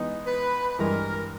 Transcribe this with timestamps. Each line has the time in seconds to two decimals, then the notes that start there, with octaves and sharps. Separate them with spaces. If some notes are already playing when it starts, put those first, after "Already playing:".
Already playing: E3 G#3 B3 D#4
0.27 B4
0.79 G2 E3 G#3 A#4